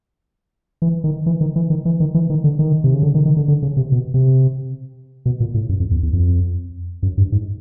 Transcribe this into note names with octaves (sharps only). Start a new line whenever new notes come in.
E3
D#3
E3
D#3
E3
D#3
E3
D#3
E3
D#3
D3
D#3
C3
C#3
D3
D#3
D#3
D3
D3
C#3
C3
B2
C3
B2
A#2
A2
F#2
F2
E2
E2
F2
F#2
G2
G#2